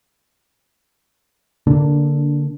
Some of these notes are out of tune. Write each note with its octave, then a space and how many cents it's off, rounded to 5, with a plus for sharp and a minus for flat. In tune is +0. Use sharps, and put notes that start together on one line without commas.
D3 -20 A#3 +0 D4 +0